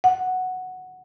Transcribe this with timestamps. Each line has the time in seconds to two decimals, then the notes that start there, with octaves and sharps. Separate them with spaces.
0.04 F#5